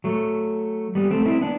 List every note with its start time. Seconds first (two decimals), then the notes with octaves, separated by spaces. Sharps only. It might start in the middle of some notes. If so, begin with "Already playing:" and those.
0.04 F#3 A3
0.95 G3 B3
1.11 A3 C4
1.26 C4 E4
1.41 B3 D4